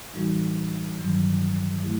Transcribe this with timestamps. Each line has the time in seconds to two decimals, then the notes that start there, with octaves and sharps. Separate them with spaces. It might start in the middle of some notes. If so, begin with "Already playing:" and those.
0.14 A2 E3 G3 D#4 F#4
0.98 G2 D#3 F#3
1.83 A3 E4 G4